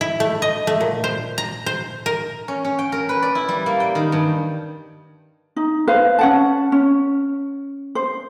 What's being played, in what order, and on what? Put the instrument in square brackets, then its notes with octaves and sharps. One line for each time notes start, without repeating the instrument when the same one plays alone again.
[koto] E4
A3
D#5
A3
A#2
C5
A#5
C5
A#4
[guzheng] C#4
C#4
G5
A#4
B4
D5
E4
G3
A#3
G5
D#3
G2
[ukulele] D#4
B4 C5 F5
C#4 F#5 A5
C#4
C5